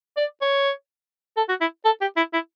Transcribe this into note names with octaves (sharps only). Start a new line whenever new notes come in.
D5
C#5
A4
F#4
E4
A4
G4
E4
E4